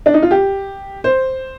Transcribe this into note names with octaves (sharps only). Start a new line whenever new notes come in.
D4
D#4
F4
G4
C5